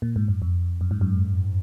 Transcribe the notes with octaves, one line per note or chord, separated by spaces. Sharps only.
A#2
G#2
F#2
F2
F#2
G#2
F#2